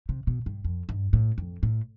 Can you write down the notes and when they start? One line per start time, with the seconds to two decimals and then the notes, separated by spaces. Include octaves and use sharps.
0.09 C3
0.27 B2
0.46 G2
0.65 F2
0.89 G2
1.13 A2
1.38 F2
1.63 A2